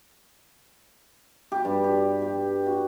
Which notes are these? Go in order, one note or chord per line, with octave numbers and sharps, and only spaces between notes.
G4
G2
G4
G4
F#4